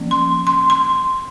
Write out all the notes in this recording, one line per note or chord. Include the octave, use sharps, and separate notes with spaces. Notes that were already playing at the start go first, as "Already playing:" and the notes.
Already playing: F3 A#3 C#4
C6
C6
C6